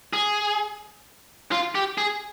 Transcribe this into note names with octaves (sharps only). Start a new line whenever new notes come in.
G#4
F4
G4
G#4